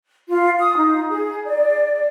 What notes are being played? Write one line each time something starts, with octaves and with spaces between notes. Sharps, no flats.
F4
D#6
D#4
G#4
D5